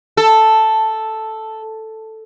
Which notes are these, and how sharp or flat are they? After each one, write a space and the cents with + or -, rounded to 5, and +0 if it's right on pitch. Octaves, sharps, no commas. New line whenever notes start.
A4 +0